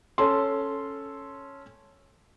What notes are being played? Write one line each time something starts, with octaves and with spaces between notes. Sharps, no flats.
C#4 A4 C6